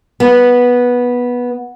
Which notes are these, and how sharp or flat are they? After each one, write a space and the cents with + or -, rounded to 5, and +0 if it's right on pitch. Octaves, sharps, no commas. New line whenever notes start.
B3 -10